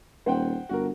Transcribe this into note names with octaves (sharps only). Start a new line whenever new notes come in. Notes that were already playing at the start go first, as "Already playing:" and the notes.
D#1 C5 F#5 G5
G1 F#4 A#4